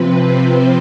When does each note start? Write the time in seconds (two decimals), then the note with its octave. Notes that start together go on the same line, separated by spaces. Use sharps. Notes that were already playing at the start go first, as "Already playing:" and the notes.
Already playing: C3 F3 C4 B4
0.20 C5